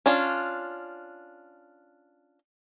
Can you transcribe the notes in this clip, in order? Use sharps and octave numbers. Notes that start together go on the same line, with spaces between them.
C#4 D4 F4